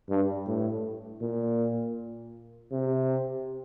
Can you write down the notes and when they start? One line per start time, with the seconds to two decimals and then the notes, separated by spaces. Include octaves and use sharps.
0.09 G2
0.47 A2
1.21 A#2
2.71 C3